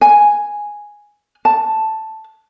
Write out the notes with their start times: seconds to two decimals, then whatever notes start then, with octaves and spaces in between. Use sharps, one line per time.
0.01 G#5
1.45 A5